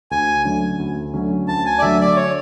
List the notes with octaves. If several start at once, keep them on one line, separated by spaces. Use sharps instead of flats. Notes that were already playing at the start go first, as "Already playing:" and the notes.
D2 G#5
D3 F#3 A3 C#4
D2
D3 F#3 A3 C#4
D2 A5
G#5
D5
D3 F#3 A3 E5
D5
C#5